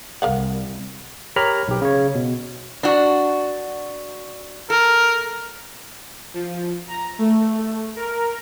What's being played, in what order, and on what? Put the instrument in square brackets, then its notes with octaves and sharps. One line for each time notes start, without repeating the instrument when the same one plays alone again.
[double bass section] C2 [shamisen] A#4 F5 F#5
[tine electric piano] G4 A#4 C#5 A#5 B5 F6
B1 G4
C#3 C#5
B2
[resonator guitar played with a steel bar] D4 F#4
[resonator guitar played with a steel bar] A4 [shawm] A#4
[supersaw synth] F3
A#5
A3
A#4